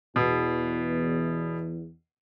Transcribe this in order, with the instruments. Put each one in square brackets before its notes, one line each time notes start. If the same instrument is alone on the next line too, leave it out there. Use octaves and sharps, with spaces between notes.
[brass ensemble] E2 [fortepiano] B2